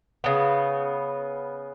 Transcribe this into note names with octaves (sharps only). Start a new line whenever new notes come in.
C#3 B3